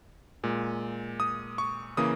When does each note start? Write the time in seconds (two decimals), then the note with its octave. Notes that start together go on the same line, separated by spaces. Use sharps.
0.43 A#2 G#3
1.20 D#6
1.58 C#6
1.97 C#3 E3 A#3 D#6